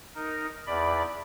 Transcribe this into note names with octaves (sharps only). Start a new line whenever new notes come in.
D#4 A#4
E2 D5 B5